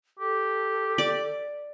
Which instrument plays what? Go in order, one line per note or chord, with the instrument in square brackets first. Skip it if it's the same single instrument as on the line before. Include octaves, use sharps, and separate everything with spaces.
[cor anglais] G4 [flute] A4
[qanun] D5